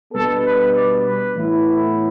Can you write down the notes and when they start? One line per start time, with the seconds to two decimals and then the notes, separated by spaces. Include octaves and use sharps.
0.13 B2 G3 B3 D4 A4
0.43 B4
0.73 D5
1.03 B4
1.34 A2 E3 B3 E4